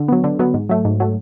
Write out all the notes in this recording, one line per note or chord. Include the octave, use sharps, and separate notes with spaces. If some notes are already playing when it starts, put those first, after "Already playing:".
Already playing: D3
F#3 B3
D3
F#3 B3
G#2
F#3 A3
G#2
F#3 A3